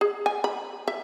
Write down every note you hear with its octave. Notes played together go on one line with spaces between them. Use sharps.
G#4
G#5
B5
E5